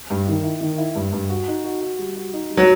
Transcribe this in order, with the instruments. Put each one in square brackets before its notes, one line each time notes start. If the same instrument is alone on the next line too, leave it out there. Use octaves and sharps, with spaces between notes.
[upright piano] G2
D#3
E4
D#3
E4
G2
G2
F#4
D#4
F#4
F#4
G3
F#4
D#4
G3
[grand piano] F#3